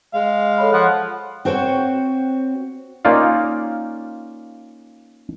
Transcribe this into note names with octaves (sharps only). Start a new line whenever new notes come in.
G#3 F5
A4 C#5 B5
F3 F#5
C4 F#4 C5 C#5 G5
A#3 C#4 D#4 F4 D5 F5